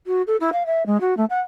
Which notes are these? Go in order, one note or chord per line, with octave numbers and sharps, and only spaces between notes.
F#4
A4
E4
F5
E5
G#3
F#4
A3
F#5